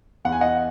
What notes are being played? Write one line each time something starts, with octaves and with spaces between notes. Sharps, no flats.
E2 F#5
G#5
D#5 F#5